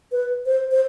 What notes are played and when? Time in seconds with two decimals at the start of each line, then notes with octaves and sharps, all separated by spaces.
0.12 B4
0.46 C5
0.71 C5